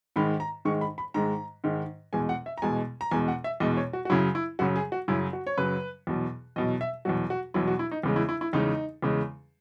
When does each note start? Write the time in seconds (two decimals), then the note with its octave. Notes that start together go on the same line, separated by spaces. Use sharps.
0.16 G#2 D#3 G#3 B5
0.40 A#5
0.65 G#2 D#3 G#3 C#6
0.81 B5
0.98 B5
1.14 G#2 D#3 G#3 A#5
1.64 G#2 D#3 G#3
2.13 E2 B2 G#3 G#5
2.29 F#5
2.46 E5
2.58 A#5
2.62 E2 B2 G#3 G#5
3.01 A#5
3.11 E2 B2 G#3 G#5
3.28 F#5
3.44 E5
3.60 E2 B2 G#3 D#5
3.77 C#5
3.93 F#4
4.05 F#4
4.10 F#2 C#3 F#3 E4
4.35 E4
4.59 F#2 C#3 F#3 F#4
4.76 G#4
4.92 F#4
5.08 F#2 C#3 F#3 E4
5.33 F#4
5.47 C#5
5.57 F#2 C#3 F#3 B4
6.07 E2 B2 F#3
6.56 E2 B2 F#3 D#5
6.81 E5
7.05 E2 B2 F#3 F#4
7.30 F#4
7.54 E2 B2 F#3 E4
7.67 F#4
7.79 E4
7.91 D#4
8.03 E2 C#3 G#3
8.16 E4
8.29 E4
8.41 E4
8.53 E2 C#3 G#3 D#4
9.02 E2 C#3 G#3